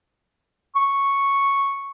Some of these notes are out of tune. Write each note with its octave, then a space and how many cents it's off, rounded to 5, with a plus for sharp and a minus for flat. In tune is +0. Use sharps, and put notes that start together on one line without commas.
C#6 -5